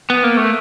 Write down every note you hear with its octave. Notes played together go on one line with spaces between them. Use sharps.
B3
A#3
A3